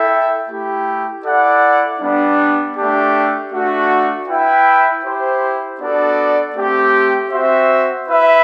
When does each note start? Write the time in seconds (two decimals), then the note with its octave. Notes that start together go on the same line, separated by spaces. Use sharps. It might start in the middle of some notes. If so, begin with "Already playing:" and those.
Already playing: E4 A4 E5 G5
0.48 A3 E4 G4
1.25 E4 A4 D5 F#5
2.00 G3 B3 D4
2.76 A3 D4 G4
3.52 A3 D4 F#4
4.28 E4 B4 E5 G5
5.04 E4 G4 C5
5.80 B3 D4 F#4 A4 D5
6.56 A3 C4 G4
7.31 C4 F#4 C5 E5
8.08 E4 B4 E5